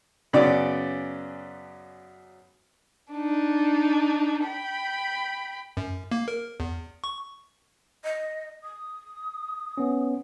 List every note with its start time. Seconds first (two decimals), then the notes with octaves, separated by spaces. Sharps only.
0.33 F#2 C#3 B3 D5
3.13 D4 D#4
4.46 G5 B5
5.77 F#2
6.11 A#3
6.28 A#4
6.60 E2
7.04 C#6
8.04 D#5
8.63 D#6
9.77 B3 C#4